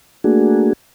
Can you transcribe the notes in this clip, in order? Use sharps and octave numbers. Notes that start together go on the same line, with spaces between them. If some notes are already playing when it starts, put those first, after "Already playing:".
A3 A#3 D4 F#4 G#4